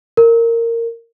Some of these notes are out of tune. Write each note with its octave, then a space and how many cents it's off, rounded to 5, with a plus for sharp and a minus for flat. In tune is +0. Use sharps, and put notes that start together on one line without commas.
A#4 -15